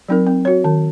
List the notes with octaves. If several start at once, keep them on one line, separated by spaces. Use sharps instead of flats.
F#3 C4 D#4 A#4
C4
F#4 C#5
D#3